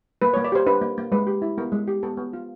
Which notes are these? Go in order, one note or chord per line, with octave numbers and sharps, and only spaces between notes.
A#3 B4
C#5
A#3
D5
G4 C5
D4 B4
A#3
A#3
G#3 B4
G4
E4
B3 A#4
G#3
G4
B3 A4
B3
F4